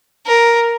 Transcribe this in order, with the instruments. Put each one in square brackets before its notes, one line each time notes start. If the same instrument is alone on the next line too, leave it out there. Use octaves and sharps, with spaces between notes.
[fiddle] A#4